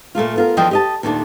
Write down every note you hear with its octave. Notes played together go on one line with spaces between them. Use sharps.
A#2 A3 A#3 F4
B3 F4 A#4
E2 E3 F3 D4 D#5 G5
G4 D#5 A5
D#2 A#2 A3 C#4 D4